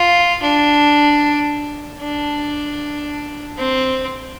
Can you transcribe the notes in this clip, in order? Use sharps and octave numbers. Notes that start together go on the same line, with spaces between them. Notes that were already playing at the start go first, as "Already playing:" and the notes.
Already playing: F4
D4
D4
C4